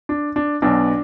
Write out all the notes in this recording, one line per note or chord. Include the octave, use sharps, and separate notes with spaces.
D4
D4
B1 B2 D4